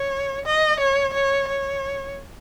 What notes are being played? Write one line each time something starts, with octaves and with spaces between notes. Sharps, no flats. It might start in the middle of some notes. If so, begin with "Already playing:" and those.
Already playing: C#5
D#5
C#5
C#5
C#5